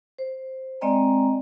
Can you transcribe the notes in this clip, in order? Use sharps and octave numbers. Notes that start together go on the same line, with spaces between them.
C5
G#3 C4 D5 D#5 G5 A#5